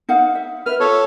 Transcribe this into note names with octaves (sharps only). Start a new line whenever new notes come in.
D#4 F5 F#5
E5
B4 E5 F6
F4 A4 C#5 E5